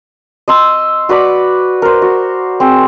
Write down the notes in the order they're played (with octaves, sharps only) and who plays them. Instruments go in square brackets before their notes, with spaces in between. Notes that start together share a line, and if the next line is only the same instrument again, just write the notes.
[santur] D#5 C6 E6
F#4 B4 D5 B5
A#4 C5
F#4
C4 G#4